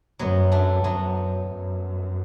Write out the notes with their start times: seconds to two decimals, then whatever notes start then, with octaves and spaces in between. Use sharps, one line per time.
0.19 F#2 F#3 B3
0.52 A3 D4
0.84 F#2 F#3 B3
1.48 F#2